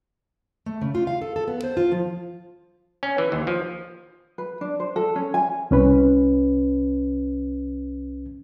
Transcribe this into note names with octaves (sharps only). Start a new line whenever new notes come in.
A3
C#3
F4
F5
A4
A4
B3
C5
F4
F3
C#4
E3
D#2
F3
B4
D4
C5
A4
C#4
G#5
C2 C#4 B4